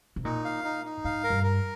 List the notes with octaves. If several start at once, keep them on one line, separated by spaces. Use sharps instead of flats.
C3
A#2 D#4
F5
D#4
D#4
G#2 F5
A#4
G2
A#4